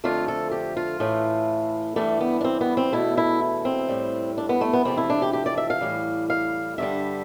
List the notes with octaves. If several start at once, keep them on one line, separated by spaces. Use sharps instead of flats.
F2 D3 F3 A3 F4
A4
G4
F4
A2 E3 A3
G2 E3 G3 A3
B3
D4
C4
B3
C4
E2 B2 A3 E4
E4
C4
A2 G3
D4
B3
A3
B3
E2 C3 F3 A3 C4
E4
D4
G4
G4
D5
E5
F5
A2 E3 G3
F5
G2 D3 G3 E5